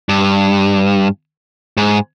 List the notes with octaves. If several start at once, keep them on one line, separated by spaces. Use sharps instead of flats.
G2
G#2